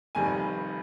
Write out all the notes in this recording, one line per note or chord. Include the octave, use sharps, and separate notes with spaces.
F1 F2 D#3 G3 G#5